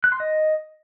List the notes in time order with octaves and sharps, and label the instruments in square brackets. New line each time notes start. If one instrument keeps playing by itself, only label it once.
[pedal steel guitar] F#6
C6
D#5